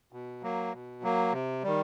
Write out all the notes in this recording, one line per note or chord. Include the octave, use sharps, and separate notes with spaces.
B2
F#3 A#3
B2
F#3 A#3
C3
D#3 G3